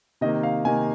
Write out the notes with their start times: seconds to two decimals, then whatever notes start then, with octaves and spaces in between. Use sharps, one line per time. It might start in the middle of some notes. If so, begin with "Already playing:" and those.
0.21 C3 D#3 A#3 D#5
0.43 F5
0.65 C3 D#3 A#3 G#5